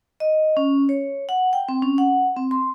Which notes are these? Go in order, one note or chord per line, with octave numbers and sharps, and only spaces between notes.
D#5
C#4
C#5
F#5
G5
C4
C#4
F#5
C4
C6